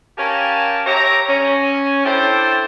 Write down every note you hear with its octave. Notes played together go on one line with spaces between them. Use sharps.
C#4 G4 A#4 F5 G#5 A5
G4 C#5 E5 A#5
C#4
D4 E4 G4 A4 C5